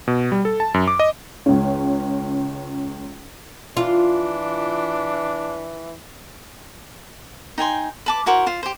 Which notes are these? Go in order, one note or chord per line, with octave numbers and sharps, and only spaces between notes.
B2
G3
A4
A5
F#2
D6
D#5
C#2 C#4
E3 D4 F4
D#4 G5 G#5 C6
B4 A5 D6
E4 F#4 A#4 C5
F4 C5
G4 C5